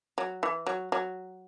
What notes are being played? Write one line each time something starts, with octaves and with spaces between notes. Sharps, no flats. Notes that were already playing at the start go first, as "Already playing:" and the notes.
F#3
E3
F#3
F#3